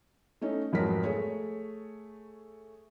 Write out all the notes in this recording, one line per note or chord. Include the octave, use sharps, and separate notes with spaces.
A3 C#4 D#4
F1 G#2 F3 F#3 A#4 B6
A3 G#4 C#5